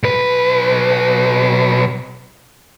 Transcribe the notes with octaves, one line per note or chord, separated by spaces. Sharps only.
B1 B4